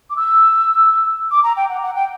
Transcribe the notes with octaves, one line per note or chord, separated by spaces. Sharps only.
D6
E6
D6
A#5
G5
F#5
F#5
G5